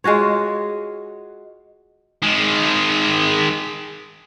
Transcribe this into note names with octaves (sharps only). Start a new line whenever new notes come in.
G#3 F4 F#4 C#5
D#3 G#3